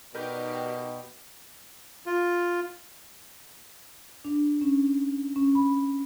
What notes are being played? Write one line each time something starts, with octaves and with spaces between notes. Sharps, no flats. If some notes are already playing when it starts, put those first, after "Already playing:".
B2 D#4 G4 A#4 B4 D5 G6
F4
D4
C#4
C#4
B5